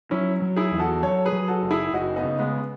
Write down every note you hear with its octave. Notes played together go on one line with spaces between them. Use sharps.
F#3 C#4 E4
F#3
E4 G#4
E2
F#4 A4
F#3 A4 C#5
G#4 B4
F#3
F#4 A4
F#1
E4 G#4
F#1 D#4 F#4
B3 D#4
C#3
G#3 B3